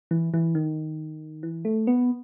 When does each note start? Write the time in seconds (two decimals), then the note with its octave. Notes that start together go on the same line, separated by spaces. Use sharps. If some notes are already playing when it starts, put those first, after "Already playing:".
0.11 E3
0.34 E3
0.55 D#3
1.43 E3
1.65 A3
1.87 B3